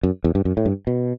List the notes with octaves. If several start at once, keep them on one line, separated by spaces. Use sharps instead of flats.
F#2
E2
G2
F#2
A2
G2
B2